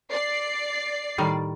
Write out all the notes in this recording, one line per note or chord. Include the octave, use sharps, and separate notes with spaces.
D5 C7
A2 D#3 G3